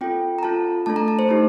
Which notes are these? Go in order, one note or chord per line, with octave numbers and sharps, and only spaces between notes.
C4 F4 A4 G5
A#5
C4 F4 A4 A5
A3 D4 A4 A5
A#5
A5
C5
A3 D#4 G4